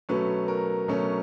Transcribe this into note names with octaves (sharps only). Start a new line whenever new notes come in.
B2 F#3 A3 C#4 B4
A#4
B2 F#3 A3 C#4